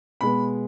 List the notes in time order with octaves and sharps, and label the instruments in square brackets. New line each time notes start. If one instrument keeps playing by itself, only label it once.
[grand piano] B2 G#3 B3 B5